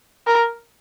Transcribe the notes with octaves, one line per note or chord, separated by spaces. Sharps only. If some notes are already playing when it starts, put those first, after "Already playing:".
A#4